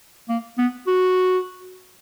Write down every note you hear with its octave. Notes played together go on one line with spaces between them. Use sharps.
A#3
B3
F#4